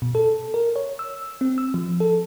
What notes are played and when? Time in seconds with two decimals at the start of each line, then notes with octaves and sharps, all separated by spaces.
0.02 B2
0.15 A4
0.54 A#4
0.76 C#5
0.99 E6
1.41 C4
1.58 E6
1.74 F3
2.00 A4